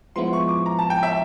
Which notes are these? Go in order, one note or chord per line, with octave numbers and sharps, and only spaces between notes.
F3 G#3 B3 E4 C6
C#6
D6
A#5
A5
G5
E5